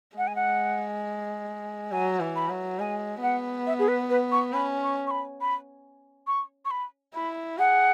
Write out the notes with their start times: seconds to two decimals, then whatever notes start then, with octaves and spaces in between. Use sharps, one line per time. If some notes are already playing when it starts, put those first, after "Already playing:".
0.17 G#3 F#5
0.27 G#5
0.36 F#5
1.91 F#3 G#5
2.21 E3
2.36 B5
2.49 F#3
2.79 G#3 G#5
3.23 B3 F#5
3.67 E5
3.79 G#4
3.88 B4
4.10 B4
4.32 C#6
4.53 C#4 B5
4.82 C#6
5.07 C#6
5.11 B5
5.41 B5
6.27 C#6
6.65 C#6
6.71 B5
7.15 E4 B5
7.58 G#4 F#5